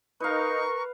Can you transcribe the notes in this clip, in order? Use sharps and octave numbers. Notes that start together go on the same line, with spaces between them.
D#4 A#4 B4 F5 C#6